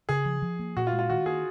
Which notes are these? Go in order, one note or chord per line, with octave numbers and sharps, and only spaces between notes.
C#3 G#4
F3
F3
A#3
A#2 F#4
F4
G#3
F4
D#3 F#4
A#3 G#4